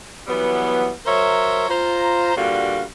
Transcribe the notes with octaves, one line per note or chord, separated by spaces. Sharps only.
E3 F#3 G3 B3
F#3 A#4 C5 C#5 E5 A#5
F4 C5 A#5
G2 A#2 D3 G3 F#4 F5